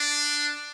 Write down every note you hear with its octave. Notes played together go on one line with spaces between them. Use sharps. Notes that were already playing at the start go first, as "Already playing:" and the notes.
Already playing: D4